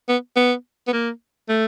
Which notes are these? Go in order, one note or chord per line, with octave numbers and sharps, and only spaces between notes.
B3
B3
B3
A#3
A3